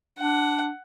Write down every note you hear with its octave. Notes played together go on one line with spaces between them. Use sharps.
D4 F#5